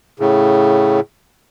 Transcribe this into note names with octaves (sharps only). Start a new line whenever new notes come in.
A2 C#3